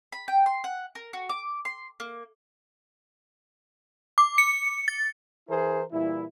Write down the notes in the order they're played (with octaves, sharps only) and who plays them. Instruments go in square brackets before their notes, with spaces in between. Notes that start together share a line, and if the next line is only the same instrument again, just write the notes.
[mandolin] B5
G5
C6
F#5
A#4
F#4
D6
C6
A#3
[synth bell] D6
C#7
A6
[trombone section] E3 E4 G#4 A#4 C5
A#2 E3 G3 E4